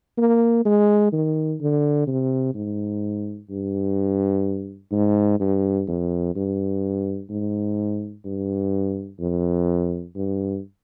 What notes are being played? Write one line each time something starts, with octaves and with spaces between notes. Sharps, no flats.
A#3
G#3
D#3
D3
C3
G#2
G2
G#2
G2
F2
G2
G#2
G2
F2
G2